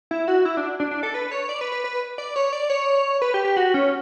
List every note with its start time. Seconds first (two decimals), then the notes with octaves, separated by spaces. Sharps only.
0.11 E4
0.28 F#4
0.45 E4
0.57 D4
0.80 D4
0.91 D4
1.03 A4
1.14 B4
1.31 C#5
1.49 D5
1.61 B4
1.72 B4
1.84 B4
2.18 D5
2.36 C#5
2.53 D5
2.70 C#5
3.22 B4
3.34 G4
3.45 G4
3.57 F#4
3.74 C#4